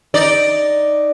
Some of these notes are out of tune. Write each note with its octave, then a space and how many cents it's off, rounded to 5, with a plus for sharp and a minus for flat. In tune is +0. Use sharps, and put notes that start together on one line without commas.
D#4 +0 D5 +0